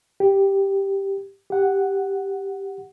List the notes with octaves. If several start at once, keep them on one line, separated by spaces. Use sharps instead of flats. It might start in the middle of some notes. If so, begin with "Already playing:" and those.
G4
G4 F#5